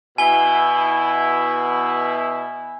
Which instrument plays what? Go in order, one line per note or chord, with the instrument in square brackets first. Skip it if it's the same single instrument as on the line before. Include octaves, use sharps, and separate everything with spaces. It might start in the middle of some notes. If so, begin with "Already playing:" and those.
[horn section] B2 E4 [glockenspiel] G#5 G7